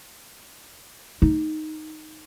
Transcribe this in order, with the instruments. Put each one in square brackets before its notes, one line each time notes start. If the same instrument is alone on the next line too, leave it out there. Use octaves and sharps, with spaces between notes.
[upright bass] D#4